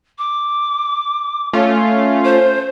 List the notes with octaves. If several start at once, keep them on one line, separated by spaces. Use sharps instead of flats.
D6
A3 C#4 F4
C5